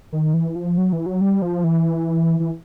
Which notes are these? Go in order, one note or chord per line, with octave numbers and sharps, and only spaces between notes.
D#3
E3
F3
F#3
E3
F#3
G3
F3
E3
E3